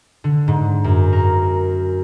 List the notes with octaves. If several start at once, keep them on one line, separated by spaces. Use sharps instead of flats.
D3
G#2
F#2
A#4